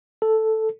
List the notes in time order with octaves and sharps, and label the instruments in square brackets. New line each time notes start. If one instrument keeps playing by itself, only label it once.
[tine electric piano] A4